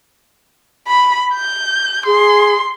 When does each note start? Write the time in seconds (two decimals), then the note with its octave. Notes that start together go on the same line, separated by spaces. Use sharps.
0.88 B5
1.35 G6
2.06 G#4 C6